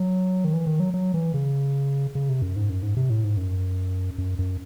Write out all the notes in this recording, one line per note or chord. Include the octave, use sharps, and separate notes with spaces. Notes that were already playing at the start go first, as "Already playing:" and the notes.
Already playing: F#3
D#3
E3
D#3
F#3
F#3
E3
C#3
C#3
C3
F#2
G#2
F#2
G#2
C3
A2
G#2
F#2
F#2
F#2